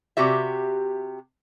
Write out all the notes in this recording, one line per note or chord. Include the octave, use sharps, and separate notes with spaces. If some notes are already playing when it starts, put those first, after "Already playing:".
C3 F#4 G4 E5